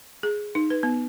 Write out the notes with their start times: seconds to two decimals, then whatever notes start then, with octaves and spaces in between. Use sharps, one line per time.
0.23 G#4
0.55 D#4
0.70 B4
0.83 B3